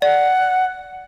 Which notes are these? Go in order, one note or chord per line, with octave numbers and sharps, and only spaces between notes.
D5 F#5